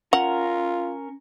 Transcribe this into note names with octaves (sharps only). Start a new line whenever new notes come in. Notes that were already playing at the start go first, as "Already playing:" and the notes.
C#4 F4 A#4 F#5 A#5